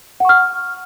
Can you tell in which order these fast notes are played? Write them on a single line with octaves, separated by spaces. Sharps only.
F#5 C#6 F6